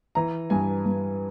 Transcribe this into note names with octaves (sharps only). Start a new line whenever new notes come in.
E3 A#5
G2 G#5
G2